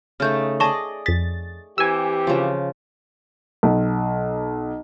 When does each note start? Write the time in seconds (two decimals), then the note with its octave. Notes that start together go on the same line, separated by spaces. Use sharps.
0.20 C#3 A3 D#4 F6 G6
0.60 G#4 D5 D#5 A5 C#6
1.06 F2 A6 B6
1.78 E3 C4 G4 G#5 E6
2.27 C#3 F3
3.63 B1